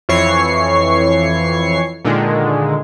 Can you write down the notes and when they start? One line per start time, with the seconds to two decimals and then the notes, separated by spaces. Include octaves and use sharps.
0.09 F2 E3 C#5 C#6 C7
2.05 A#2 D3 D#3 G#3